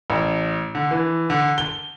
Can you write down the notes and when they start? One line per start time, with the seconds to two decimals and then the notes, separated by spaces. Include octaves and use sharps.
0.10 A1
0.75 D3
0.91 E3
1.30 D3
1.58 G7